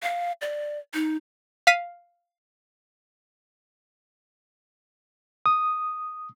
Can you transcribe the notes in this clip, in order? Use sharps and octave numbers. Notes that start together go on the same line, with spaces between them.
F5
D5
D#4
F5 B6 D#7
D#6